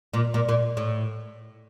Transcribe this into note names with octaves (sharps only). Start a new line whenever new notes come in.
A#2
A#2
A#2
A2